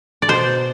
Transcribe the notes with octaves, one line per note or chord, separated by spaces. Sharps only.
D5
B2 C5